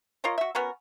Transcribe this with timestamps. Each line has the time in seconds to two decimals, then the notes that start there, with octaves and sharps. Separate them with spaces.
0.24 F4 A#4 C#5 D#5
0.38 F#4 E5
0.55 B3 C#4 F#4 A#4